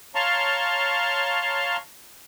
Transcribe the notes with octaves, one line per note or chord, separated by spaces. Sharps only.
C#5 F5 A5 A#5 C6 C#6